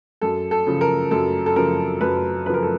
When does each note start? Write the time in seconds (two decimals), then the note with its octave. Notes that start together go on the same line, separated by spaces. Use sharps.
0.21 F#2 A4
0.51 A4
0.67 C#3 F3
0.81 A#4
1.11 F#2 A4
1.46 A4
1.56 C#3 F3 A#4
2.01 F#2 B4
2.45 C#3 B4
2.50 F3 A#4
2.63 A4